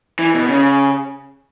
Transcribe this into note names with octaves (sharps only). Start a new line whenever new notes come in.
E3
B2
C#3